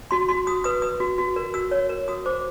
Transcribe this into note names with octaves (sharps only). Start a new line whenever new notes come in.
F#4 C6
F#4 C6
F#4 D#6
B4 D#6
B4 D#6
F#4
F#4
A#4
F#4 E6
C#5
A#4
F#4 D#6
C5 D6